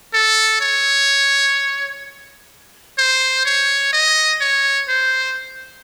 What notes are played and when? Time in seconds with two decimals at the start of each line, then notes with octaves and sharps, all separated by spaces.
0.14 A4
0.61 C#5
2.98 C5
3.45 C#5
3.93 D#5
4.40 C#5
4.88 C5